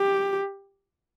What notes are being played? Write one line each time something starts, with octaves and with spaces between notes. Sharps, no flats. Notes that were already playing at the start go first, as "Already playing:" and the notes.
Already playing: G4